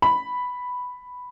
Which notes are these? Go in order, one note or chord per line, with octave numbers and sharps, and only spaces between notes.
B5